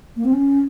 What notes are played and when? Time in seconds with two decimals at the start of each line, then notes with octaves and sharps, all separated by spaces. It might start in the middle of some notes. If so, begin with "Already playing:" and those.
0.16 A#3
0.25 C4
0.33 C#4